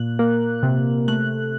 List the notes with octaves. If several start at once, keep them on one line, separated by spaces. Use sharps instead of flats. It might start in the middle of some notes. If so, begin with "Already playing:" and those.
Already playing: A#2 F#6
A#3
C3
A3 F#6